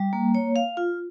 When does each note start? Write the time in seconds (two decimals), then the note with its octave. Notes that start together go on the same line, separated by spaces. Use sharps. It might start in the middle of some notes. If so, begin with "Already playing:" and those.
Already playing: G3
0.13 A#3
0.35 C#5
0.56 F5
0.77 F4